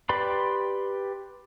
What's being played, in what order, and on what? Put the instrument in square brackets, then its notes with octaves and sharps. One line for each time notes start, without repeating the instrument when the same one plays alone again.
[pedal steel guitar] G4 B4 D5 B5 C6